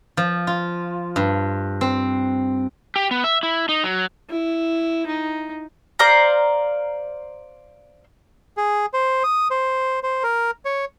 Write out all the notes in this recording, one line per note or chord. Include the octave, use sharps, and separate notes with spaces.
F3
F4
G2
C4
G4
B3
E5
E4
D#4
F#3
E4
D#4
C5 D5 F5 A#5
G#4
C5
D#6
C5
C5
A#4
C#5